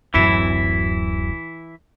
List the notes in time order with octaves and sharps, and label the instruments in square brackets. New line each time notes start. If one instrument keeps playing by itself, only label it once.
[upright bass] D1 F#2 [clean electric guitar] E3 E4